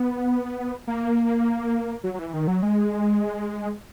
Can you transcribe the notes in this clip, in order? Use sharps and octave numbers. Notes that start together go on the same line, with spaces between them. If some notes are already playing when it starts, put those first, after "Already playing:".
Already playing: B3
A#3
F#3
F#3
E3
D#3
F#3
G#3